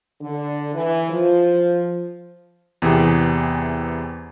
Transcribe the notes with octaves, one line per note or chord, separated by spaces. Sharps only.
D3
E3
F3
E2 C3 E3 G4 G#4